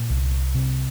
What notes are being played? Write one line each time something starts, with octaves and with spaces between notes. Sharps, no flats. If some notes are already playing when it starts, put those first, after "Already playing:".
Already playing: A#2
C2
C3